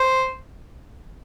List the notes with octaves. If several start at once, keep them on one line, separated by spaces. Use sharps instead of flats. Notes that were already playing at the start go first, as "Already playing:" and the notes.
Already playing: C5